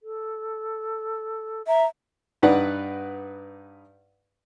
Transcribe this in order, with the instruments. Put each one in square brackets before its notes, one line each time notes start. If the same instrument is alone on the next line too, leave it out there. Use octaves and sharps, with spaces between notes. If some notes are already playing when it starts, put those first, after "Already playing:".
[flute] A4
[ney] E5 [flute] A#5
[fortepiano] G2 D#4 B4 D5 F#5